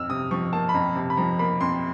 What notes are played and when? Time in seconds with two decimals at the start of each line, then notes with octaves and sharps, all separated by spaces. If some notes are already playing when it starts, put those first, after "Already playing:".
Already playing: F2 E6 F6
0.10 C3 D#6
0.31 F3 C#6
0.53 A#3 A5
0.69 B5
0.74 F2 A#5
0.95 C3 A5
1.10 B5
1.17 F3 A#5
1.39 A#3 B5
1.61 F2 C6